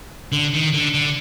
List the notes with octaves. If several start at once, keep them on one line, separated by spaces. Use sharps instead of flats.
D3
D#3
D3
D3